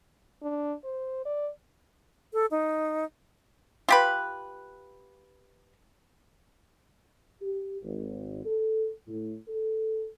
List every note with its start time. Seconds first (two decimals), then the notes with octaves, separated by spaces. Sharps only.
0.42 D4
0.84 C5
1.25 D5
2.33 A4
2.51 D#4
3.89 F4 G4 B4
7.42 G4
7.83 G#1
8.45 A4
9.08 A2
9.48 A4